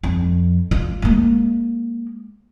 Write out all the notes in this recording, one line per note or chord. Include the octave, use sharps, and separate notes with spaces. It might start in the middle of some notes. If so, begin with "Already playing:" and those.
F2
F4
G#3 A#3